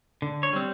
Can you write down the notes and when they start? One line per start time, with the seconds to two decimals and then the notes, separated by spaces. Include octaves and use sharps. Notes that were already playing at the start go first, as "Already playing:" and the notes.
0.22 D3
0.43 C#5
0.53 G3 C4